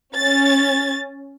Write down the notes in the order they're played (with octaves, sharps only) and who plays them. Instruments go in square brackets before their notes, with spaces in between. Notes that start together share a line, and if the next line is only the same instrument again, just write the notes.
[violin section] C#4 A6